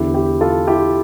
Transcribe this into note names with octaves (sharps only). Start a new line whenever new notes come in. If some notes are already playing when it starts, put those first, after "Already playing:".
Already playing: E2 D3 E4 G4
E4 G4
F4 A4
E4 G4